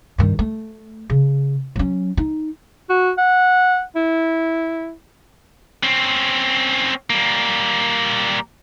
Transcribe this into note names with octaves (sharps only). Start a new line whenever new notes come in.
G2 D#3
A3
C#3
F#3 C#4
D#4
F#4
F#5
E4
C4 C#4
G3 A#3